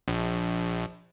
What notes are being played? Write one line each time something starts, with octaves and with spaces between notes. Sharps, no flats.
A#1